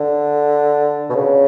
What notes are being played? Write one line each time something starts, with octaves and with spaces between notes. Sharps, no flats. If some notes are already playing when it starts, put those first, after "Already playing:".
Already playing: D3
B2
C#3